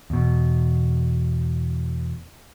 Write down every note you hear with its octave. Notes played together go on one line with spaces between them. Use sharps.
E2 B2